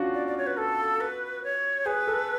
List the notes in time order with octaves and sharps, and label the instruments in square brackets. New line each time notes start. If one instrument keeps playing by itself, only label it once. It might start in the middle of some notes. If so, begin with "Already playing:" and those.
Already playing: [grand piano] C#4 D4 F4 F#4
[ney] D5
D5
C#5
B4
A4
B4
C#5
[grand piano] G#4 [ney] B4
[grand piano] A4